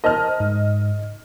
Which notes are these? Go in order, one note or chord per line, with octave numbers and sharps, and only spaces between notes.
A#4 C5 D#5 A5 F6
G#2